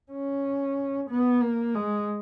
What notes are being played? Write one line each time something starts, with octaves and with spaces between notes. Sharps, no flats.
C#4
B3
A#3
G#3